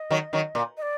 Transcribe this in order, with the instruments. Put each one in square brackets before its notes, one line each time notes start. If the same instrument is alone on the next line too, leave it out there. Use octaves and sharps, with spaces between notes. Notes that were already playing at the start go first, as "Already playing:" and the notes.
Already playing: [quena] D#5
[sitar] D#3 F#3
D#3 F#3
A#2
[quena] D#5
D5